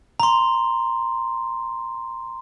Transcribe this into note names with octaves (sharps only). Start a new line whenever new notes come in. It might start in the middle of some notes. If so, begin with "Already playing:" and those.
A#5 C6